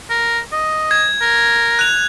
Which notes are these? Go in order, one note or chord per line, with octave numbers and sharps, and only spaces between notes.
A#4
D#5
G#6
A#4
F#6 F7